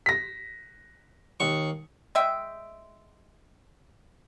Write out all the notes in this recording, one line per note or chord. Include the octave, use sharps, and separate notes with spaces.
A#6 B6
D#2 C#6
G#3 E5 G5